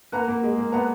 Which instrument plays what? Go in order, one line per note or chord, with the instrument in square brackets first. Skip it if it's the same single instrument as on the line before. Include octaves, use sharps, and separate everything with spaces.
[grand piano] A#3 [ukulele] B4 F#5 A#5
[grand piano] A#3
G#3
A#3
[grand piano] B3 [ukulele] B4 F#5 A#5